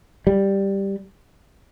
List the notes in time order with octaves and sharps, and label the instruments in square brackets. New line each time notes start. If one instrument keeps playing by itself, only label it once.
[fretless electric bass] G3